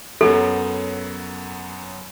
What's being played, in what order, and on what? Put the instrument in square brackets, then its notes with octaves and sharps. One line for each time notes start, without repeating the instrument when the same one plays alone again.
[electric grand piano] F#2 F#3 B3 [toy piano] A4